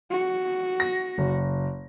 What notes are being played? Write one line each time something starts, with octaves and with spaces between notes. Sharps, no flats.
F#4
A#6
F#1